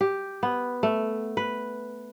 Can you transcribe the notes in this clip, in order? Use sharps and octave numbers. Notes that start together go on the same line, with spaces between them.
G4
B3
A3
B4